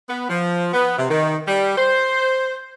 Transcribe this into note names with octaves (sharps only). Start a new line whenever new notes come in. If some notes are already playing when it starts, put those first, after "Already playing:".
B3
F3
B3
C3
D#3
G3
C5